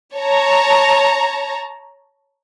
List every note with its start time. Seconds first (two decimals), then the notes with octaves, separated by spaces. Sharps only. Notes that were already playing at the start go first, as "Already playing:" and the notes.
0.16 C#5 A5 A#5